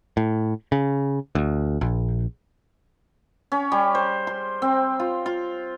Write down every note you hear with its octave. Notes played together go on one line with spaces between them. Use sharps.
A2
C#3
D2
A#1
C#4
G3
C5
C6
C4
F4
F4